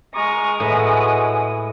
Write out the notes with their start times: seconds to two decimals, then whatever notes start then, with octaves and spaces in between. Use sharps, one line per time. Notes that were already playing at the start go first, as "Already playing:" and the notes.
0.14 G#3 A#5 C#6 D#6 F6
0.60 A2 F#4 B4